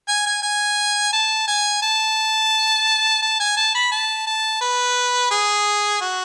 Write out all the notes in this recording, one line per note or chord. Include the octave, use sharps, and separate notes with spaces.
G#5
G#5
G#5
A5
G#5
A5
A5
G#5
A5
B5
A5
A5
B4
G#4
F#4